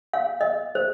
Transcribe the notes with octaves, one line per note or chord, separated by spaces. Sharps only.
F5
D#5
C5